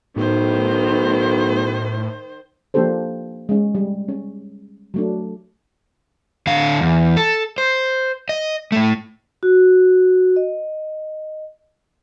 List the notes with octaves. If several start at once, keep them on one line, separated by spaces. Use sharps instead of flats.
B1 A2 D#3 C5
F3 A#3 D4 G4 A4 C5
G#3 C#4
G3
C#4
F#3 A3 D4
D3 F5
E2
A4
C5
D#5
A2 A3
F#4
D#5